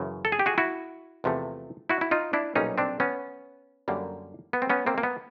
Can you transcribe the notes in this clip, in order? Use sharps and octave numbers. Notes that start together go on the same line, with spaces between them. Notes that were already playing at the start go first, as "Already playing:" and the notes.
Already playing: F#2 C#3 E3
A4
G#4
G4
F#4 G#4
E4 F#4
E2 C3 F3 A3
E4 F#4
E4
D#4 F4
D4 E4
B1 A#2 G3 A#3 C#4 D#4
C4 D4
B3 C#4
F#2 D3 G3 A#3
B3
C4
B3 C#4
A#3 C4
A#3
B3